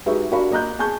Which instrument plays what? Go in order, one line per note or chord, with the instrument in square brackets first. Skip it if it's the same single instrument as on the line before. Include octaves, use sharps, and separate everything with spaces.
[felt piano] G#3 D#4 F#4 G4 B4 E5
D4 F#4 G4 A#4 F5 B5
A#3 D#5 A#5 F#6 G6
G#4 G#5 A5 C#6 G6